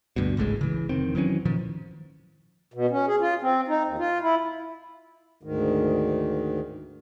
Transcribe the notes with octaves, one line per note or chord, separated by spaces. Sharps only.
D2 G2 B2
G#1 C#2 A2 G#3
C#3 E3
F1 D#3 C4
D#3 E3 F#3 C#4
A#2 D#3 F3
B2
C#4
G#4
F4
C4
D#4
D#2
F4
E4
D2 G#2 D#3